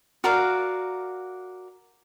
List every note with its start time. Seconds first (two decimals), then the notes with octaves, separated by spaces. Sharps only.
0.24 F#4 A#4 D5 F5